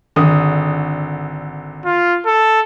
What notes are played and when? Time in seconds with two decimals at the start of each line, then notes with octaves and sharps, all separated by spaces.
0.16 G#1 D3 D#6
1.86 F4
2.26 A4